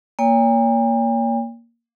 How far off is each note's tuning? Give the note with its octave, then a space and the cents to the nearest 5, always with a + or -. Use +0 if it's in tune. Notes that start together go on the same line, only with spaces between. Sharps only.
A#3 +0 C#5 +40 G5 +45